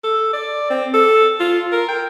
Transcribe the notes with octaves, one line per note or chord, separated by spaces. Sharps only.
A4
D5
C4
A4
F4
A#4
G5